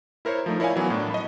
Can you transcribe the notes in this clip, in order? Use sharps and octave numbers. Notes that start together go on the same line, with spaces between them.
E4 A#4 C5 C#5
F3 A3 D#4
E4 A#4 C#5 D5 F5 G#5
E3 F#3 B3
A2 D4
D#5 B5